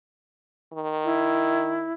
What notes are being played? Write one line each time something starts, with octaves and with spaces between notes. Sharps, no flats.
D#3
E4